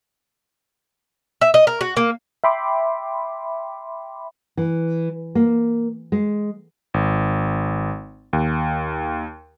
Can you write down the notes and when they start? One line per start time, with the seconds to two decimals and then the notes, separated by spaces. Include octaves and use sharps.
1.41 E5
1.54 D#5
1.67 A#4
1.81 F#4
1.97 A#3
2.44 E5 G5 B5 C6 D6
4.57 E3
5.35 A#3
6.12 G#3
6.94 G#1
8.33 D#2